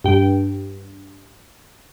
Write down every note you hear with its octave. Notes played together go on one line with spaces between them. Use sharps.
G2 G5